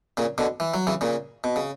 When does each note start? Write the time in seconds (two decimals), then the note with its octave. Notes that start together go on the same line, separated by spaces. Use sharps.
0.17 A#2 C#3
0.38 B2 D3
0.60 E3
0.74 F#3
0.87 C#3 E3
1.01 A#2 C#3
1.44 B2
1.56 C#3